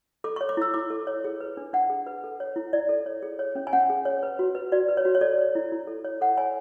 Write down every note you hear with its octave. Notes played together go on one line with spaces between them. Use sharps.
A4 D6
C#6
C#5
D6
E4 E6
E4 D6
A4
C#5
G#4
B4
D4
D4 F#5
G#4
B4
A4
C#5
E4
E4 D5
A4
C#5
G#4
C#5
C#4
G#5
C#4 F#5
G#4
C#5
B4
F#4
B4
F#4 D5
B4
C#5
F#4
C#5
A4 D5
C#5
E4
E4
A4
C#5
A4 F#5
C#5 G#5